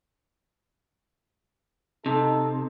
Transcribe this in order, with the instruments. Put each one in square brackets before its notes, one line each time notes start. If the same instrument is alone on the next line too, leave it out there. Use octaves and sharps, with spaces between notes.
[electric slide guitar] C3 [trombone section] D#4 A4